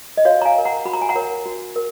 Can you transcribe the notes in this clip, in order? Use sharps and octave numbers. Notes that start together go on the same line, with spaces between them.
D#5
F#4 C#5 F5
A#5
F5 G#5
A#4 C#5
F#5 A#5
F#4 B5
A#5
G#5
F#5 A#5
A#4 C#5
F#4
A#4